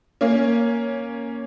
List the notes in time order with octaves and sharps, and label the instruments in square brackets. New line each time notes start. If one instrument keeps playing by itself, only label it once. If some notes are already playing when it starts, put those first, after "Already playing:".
[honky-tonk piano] A#3 C#4